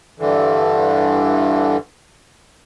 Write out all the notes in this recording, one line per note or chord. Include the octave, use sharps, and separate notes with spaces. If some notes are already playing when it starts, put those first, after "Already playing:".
G2 D3 E3